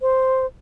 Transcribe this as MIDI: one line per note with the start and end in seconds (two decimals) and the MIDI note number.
0.01 0.46 72